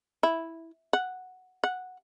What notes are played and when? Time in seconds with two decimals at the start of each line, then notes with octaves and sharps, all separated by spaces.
0.23 E4
0.93 F#5
1.64 F#5